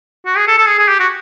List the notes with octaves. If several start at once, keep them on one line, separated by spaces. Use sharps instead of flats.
F#4
G#4
A4
A4
G#4
G#4
G4
F#4